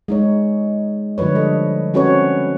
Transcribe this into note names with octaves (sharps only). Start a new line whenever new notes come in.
G#3 D#4 C#5
D3 F3 G3 B4 C#5
A4 D#5
C4 C#4 F#4 A4 B4 C#5